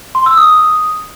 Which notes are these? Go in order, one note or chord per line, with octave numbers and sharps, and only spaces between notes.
C6
E6
D#6